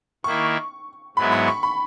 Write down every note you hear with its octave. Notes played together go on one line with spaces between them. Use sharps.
D#3 A#3 E4 C#6
G#2 F#3 B3 E4 B5
B5
C#6
B5